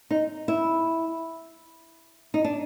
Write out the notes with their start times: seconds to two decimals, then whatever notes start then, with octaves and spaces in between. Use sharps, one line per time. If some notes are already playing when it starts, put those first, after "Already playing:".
0.11 D#4
0.48 E4
2.34 D#4
2.44 D4